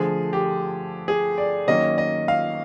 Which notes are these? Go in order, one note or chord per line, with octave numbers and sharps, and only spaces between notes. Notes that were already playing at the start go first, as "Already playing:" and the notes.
Already playing: D3 F3 A3 G#4
G4
G#4
D5
D#3 F#3 A#3 C#4 D#5
D#5
F5